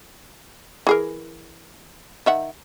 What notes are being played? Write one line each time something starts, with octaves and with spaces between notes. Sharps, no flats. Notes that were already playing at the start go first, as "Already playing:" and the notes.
E3 G#4 A#4
D#3 E5 F#5